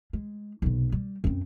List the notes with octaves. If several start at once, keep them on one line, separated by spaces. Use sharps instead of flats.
G#3
B1 C3
G3
F#2 C4